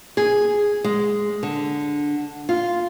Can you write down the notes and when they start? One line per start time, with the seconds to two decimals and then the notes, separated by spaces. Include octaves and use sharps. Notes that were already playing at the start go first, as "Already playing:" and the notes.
0.17 G#4
0.84 G#3
1.43 D3
2.49 F4